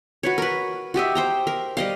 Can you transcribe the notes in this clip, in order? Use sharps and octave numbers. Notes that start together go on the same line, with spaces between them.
F#4 B4 C#5
A#4 B4
F#4 G4 D#5 E5
C5 G5 A#5
A#4
G3 D#5 F5